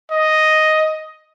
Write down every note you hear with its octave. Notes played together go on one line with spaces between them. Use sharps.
D#5